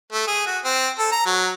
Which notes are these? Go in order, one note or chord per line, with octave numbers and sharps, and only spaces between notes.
A3
G#4
F#4
C4
A4
A#5
F#3